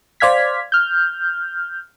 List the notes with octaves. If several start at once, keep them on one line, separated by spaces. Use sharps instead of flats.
C5 D5 F5 F6 G#6 B6
F6 G6